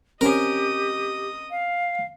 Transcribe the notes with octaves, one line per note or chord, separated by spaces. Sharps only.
C4 C#4 G4 A#4 D#5 G#5 D#6
F5